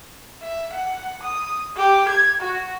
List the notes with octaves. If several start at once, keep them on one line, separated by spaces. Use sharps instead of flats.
E5
F#5
D#6
G4
G#6
F#4